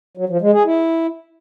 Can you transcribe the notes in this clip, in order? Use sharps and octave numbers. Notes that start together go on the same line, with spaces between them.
F#3
F3
G#3
G#4
E4